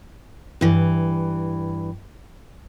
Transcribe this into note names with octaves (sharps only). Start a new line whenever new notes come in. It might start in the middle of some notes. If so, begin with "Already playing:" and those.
G2 E3